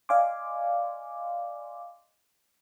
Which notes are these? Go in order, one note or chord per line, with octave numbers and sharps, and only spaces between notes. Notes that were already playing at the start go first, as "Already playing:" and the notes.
D5 D#5 F5 G#5 C6 D6